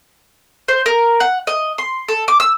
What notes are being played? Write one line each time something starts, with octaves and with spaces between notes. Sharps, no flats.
C5
A#4
F#5
D#5
C6
A4
D6
E6